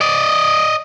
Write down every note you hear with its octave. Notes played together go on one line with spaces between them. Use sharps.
D5 D#5